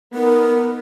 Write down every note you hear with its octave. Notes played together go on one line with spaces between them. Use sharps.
B3 D#4 A#4